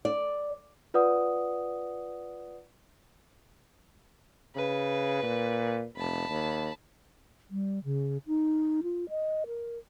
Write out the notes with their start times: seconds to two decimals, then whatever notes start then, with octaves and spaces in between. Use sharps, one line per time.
0.05 D5
0.94 F4 B4 D5 F#5 D#6
4.56 C#3 B4
5.23 A#2
5.97 F1 A5 B5
6.29 D#2
7.51 G3
7.84 C#3
8.27 D#4
8.83 F4
9.09 D#5
9.47 A#4